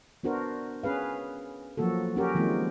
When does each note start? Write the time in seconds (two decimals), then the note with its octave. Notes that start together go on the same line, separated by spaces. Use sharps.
0.23 B3 D4 F#4 A#4 C5
0.83 C#4 G#4 B4 F5
1.77 F3 F#3 A#3 F#4 A4
2.16 C#4 F#4 G4 A#4
2.35 D#3 F3 G3 G#3 A#3 C4